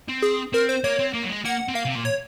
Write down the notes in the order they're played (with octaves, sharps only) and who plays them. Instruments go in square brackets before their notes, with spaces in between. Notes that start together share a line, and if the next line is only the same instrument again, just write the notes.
[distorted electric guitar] C4
[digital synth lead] G#4
[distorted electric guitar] C4 [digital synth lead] A#4
[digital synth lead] C5
[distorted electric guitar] A#3 [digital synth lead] C#5
[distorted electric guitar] C4
A#3
F#3
G#3
[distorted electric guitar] A#3 [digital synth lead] F#5
[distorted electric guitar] C4
[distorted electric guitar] A#3 [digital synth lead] F5
[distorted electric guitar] C3
A#2
[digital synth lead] C#5